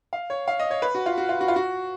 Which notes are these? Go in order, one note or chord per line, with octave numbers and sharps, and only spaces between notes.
F5
C#5
F5
D#5
C#5
B4
F#4
F4
F#4
F4
F#4
F4
F#4